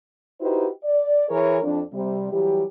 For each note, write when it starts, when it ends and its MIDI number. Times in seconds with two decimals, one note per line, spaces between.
0.41 0.67 63
0.41 0.67 64
0.41 0.67 66
0.41 0.67 67
0.41 0.67 71
0.41 0.67 72
0.83 1.26 74
1.29 1.58 52
1.29 1.58 68
1.29 1.58 70
1.29 1.58 73
1.63 1.81 41
1.63 1.81 62
1.93 2.30 48
1.93 2.30 55
2.32 2.63 52
2.32 2.63 54
2.32 2.63 55
2.32 2.63 67